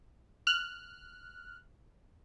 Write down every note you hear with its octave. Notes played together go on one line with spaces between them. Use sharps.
F6 F#6